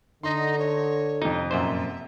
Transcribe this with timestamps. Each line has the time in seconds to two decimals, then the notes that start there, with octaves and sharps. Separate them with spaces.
0.23 D3 D#4 D#5 C6
0.58 C#5
1.22 F2 C3 D#4
1.51 F#2 A#2 C5 E5